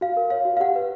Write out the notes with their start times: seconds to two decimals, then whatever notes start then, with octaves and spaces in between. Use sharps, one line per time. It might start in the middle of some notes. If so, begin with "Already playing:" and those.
0.01 F#4 F5
0.17 A#4
0.31 C#5 F5
0.45 F#4
0.57 F5
0.60 G4 F#5
0.76 B4